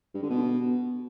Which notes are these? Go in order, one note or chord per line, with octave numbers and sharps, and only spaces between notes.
G2
D3
B2